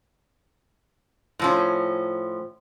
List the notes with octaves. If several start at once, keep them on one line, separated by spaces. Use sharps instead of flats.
A2 F3 C#4